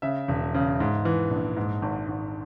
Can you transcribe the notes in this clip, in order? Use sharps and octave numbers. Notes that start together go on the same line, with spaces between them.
C#3 E5
E1
C#3
G#2
E3
A#1
G#2
G#1
G#1